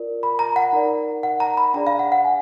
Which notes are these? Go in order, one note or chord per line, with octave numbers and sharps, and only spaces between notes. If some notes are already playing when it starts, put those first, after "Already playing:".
Already playing: F4 A#4 D5
B5
A#5
F#5
D#4 A#4 D5
F#5
A#5
B5
D4 G#4 D5 A#5
F5
F#5
F#5
G#5